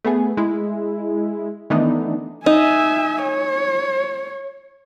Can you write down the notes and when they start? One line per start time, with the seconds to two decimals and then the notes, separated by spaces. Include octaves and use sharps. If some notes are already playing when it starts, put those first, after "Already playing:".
0.04 A3 B3 G#4
0.37 G#3 E4
1.70 D#3 E3 A3 B3 D4 D#4
2.46 D#4 E5 G#5
3.23 C#5